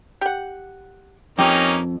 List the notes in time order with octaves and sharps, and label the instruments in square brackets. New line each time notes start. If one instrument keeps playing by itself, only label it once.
[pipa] G4 F#5
[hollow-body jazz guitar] F2 [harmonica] A#3 C#4 D#4 [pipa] G4